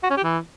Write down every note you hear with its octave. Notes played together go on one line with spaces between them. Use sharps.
F#4
C#4
G4
E3